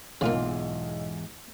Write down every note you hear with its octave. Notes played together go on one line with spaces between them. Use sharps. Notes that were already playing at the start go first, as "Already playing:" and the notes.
B1 E2 G#2 C#3 A#3 F4